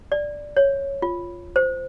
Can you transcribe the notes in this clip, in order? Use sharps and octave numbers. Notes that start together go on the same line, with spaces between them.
D5
C#5
F4
C5